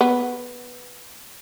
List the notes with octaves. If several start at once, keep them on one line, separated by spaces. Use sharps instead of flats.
B3